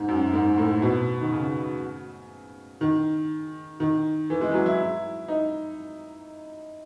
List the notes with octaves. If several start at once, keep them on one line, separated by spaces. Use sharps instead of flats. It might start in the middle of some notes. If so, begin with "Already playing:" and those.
Already playing: G#2
F#2
G#2
A2
B2
D#3
C#3
D#3
D#3
E3
G#3
E3
F#3
E4
D#4